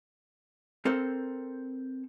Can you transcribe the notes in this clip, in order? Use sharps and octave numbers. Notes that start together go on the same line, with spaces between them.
C4 A4 A#4 C5